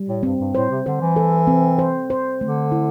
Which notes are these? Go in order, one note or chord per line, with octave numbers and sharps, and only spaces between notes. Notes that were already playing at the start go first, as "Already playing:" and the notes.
Already playing: G3
A2
G2 C4
G2
A2 C5
C3
D3 C5
E3
A4
C4
C5
C5
D3 A3
E4